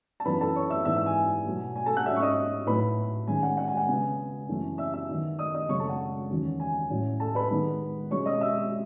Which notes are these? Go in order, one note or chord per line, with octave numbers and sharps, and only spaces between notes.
A5
F#2 E3 B3 D#4 B4 B5
A4 A5
C#5 C#6
E5 E6
G#2 E3 B3 D#4 E5 E6
E5 E6
G#5
B2 F#3 A3
G#5
A4 A5
F#5 F#6
G#2 F#3 C#4 E5 E6
C#6
D#5 D#6
A2 F#3 A3 D#4 B4 B5
D#3 G#3 C#4 G#5
F#5
F#5
G#5
F#5
C#3 F#3 B3 G#5
F#2 E3 A3
E5 E6
E5 E6
D#3 F#3 B3 D#4
D#5 D#6
D#5 D#6
F#2 C#3 G#3 C#5 C#6
A4 A5
F#5
E2 D#3 F#3 C#4
G#5
A2 F#3 C#4
A4 A5
B4 B5
D#3 G#3 B3 D#4
B2 G#3 C#4 C#5 C#6
D#5 D#6
E5 E6